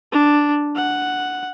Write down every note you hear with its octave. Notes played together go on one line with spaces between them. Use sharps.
D4
F#5